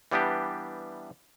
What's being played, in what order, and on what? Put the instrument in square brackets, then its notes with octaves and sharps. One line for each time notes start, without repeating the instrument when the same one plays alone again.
[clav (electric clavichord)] E3 G3 B3 D4 G4